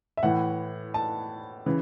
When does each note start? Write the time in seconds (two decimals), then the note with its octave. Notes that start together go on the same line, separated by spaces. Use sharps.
0.17 E5
0.23 A2 E3 F#5
0.94 A5
1.66 C#3 E3